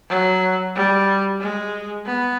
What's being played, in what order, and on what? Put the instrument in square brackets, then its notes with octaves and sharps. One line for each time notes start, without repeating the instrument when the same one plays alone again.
[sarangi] F#3
G3
G#3
B3